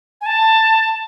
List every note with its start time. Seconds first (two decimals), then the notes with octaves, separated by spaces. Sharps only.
0.21 G#5
0.26 A5